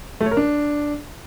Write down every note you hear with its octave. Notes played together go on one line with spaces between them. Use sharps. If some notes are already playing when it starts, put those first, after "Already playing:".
A3
C#5
A#4
D4